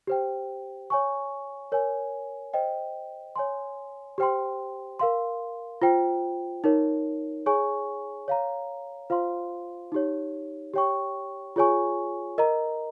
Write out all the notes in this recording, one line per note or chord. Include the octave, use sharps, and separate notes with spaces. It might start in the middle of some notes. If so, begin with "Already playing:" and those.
G4 C5 G5
C#5 G#5 C#6
A#4 C#5 G#5
C5 D#5 G5
C#5 G#5 C6
G4 C5 G5 C6
A#4 F5 C6
F4 C5 G5
D#4 A#4 C#5
G#4 C#5 G#5 C#6
C#5 F5 A#5
F4 C5 F5 C6
D#4 G4 C#5
G4 C#5 G5 C#6
F4 G#4 C#5 G#5 C#6
A#4 D#5 A#5